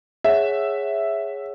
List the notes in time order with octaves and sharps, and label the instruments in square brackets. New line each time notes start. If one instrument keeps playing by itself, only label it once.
[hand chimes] G#4 C#5 F#5 [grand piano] E5